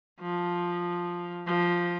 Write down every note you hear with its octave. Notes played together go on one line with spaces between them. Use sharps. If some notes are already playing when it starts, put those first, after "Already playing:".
F3
F3